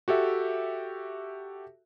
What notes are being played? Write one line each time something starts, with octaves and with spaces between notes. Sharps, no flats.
F#4 G4 A4 E5